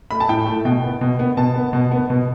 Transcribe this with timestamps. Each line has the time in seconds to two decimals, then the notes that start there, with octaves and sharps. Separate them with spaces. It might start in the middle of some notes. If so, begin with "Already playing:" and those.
0.11 A3 B5
0.20 A5
0.29 A2 G5
0.46 A3
0.65 B2 G5
0.84 B3
1.01 B2
1.19 B3
1.37 B2 A5
1.56 B3
1.73 B2
1.91 B3
2.10 B2